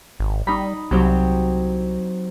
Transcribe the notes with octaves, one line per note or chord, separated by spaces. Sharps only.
G#1
G3 D#4 B5
C2 F#3 C4 G4